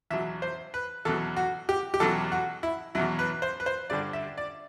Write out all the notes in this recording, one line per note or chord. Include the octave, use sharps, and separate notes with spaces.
E2 B2 F#3 E5
C5
B4
E2 B2 F#3 A4
F#4
G4
G4
E2 B2 F#3 A4
F#4
E4
E2 B2 F#3 E4
B4
C5
B4
C5
G2 D3 G3 D4 D5
E5
D5